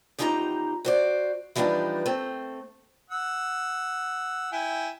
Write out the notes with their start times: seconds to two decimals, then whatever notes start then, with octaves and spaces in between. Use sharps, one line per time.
0.19 E2 F3 D#4 G4 G#5 A#5
0.85 F#4 C5 D5
1.56 E3 F3 G3 D4 D#4 B4
2.06 A3 C4
3.10 F#5 E6
4.52 E4 G5 G#5